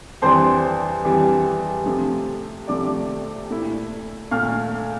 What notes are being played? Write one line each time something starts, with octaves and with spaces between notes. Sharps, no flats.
F2 E3 G3 D4 C5 C6
F2 E3 G3 D4
C3 F3 A3
C3 F3 A3 D5 D6
A#2 A3 E4
A#2 A3 F5 F6